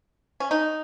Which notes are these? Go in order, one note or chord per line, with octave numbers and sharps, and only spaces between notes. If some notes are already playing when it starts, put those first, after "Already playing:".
C#4
D#4